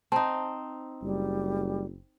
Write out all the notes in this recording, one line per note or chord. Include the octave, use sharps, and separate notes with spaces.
C4 D#4 A5
F#1 G3